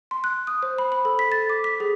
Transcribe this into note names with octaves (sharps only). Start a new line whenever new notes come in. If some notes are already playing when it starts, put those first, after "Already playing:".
C6
F#6
D#6
C5
B5
B5
A4
B6
A6
D6
B6
G#4